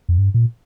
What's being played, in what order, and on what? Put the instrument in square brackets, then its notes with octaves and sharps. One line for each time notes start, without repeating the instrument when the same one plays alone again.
[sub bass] F2
G2
A#2